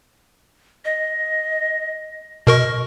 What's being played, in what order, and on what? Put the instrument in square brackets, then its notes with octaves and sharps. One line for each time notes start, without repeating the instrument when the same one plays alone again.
[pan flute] D#5
[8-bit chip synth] B2 A#4 C#6 [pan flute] D#5